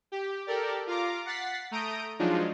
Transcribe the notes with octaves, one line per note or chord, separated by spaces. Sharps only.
G4
G4 A4 A#4 D5
F4 F5 A#5 D6
F#5 A6 B6 C7
A3 A#5 D#6 G6 D7
F3 F#3 G#3 D4 D#4 F4